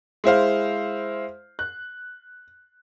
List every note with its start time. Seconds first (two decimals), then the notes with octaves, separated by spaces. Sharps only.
0.24 G#3 E4 C5 F5
1.59 F#6